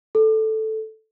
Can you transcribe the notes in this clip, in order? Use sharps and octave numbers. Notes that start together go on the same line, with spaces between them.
A4